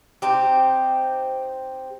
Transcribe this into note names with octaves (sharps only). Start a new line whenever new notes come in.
C4 D#4 G4